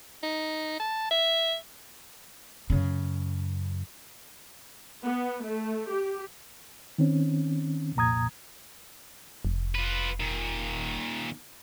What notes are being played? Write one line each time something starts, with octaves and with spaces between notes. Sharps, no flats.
D#4
A5
E5
F#2 C#3
B3
A3
G4
D#3 C4 C#4
C2 F2 A#2 A#5 D#6 G#6
F1
F4 B4
A#2 D#3